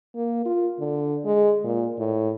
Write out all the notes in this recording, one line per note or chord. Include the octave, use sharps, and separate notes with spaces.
A#3
F4
D3
G#3
A#2
A2